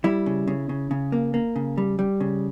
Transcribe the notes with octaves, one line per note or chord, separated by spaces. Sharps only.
G3 E4
C#3
C#3
C#3
C#3
A#3
A#3
C#3
G3
G3
C#3